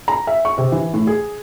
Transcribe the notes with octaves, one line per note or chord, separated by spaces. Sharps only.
A#5
E5
C#6
C3
E3
A2
G#4